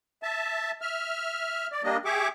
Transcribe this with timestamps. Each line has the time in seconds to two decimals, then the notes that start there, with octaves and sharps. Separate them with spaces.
0.23 E5 A5
0.81 E5 F6
1.72 D5
1.84 G3 A#3 D4 D#5
2.05 G4 G#4 E5 C#6 D6